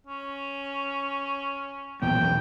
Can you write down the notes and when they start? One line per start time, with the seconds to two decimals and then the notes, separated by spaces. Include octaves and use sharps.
0.07 C#4
2.02 B1 E2 A#2 G5